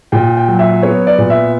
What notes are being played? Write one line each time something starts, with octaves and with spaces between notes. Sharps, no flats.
A#2 G5
G5
F#3
E5
B3 C#5
D5
A#2
E5